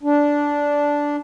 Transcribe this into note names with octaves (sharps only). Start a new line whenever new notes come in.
D4